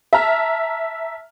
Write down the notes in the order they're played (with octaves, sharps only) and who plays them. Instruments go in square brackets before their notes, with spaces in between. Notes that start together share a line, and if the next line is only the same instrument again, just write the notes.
[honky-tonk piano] E5 A5 A#5 F6